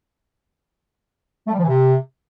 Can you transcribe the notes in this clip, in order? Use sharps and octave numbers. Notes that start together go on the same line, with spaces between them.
A3
G3
F3
E3
C3